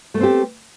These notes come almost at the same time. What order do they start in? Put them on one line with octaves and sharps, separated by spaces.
A3 B3 C4 G4